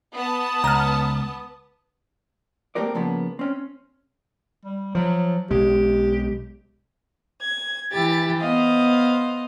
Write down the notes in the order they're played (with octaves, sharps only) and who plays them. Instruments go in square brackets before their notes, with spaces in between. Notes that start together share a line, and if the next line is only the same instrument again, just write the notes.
[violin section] B3 A5 [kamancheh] D#6
[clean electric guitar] C#2 [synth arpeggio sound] A#5 F6
[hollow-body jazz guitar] A3 A#3 C4 G4 A#4 D5
C#3 F3 A#3 B3
C4 C#4
[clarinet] G3
[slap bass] F3 [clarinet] F#3
[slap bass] B1 G#3 [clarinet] G4
[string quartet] G#6
E3 E4 G4 A6
B3 C5 D#5 F5